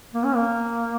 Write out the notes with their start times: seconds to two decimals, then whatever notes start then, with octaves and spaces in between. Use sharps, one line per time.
0.14 A#3
0.25 C#4
0.35 A#3